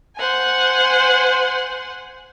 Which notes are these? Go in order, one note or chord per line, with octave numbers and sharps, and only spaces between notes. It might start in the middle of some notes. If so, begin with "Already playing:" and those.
C5 F#5 G#5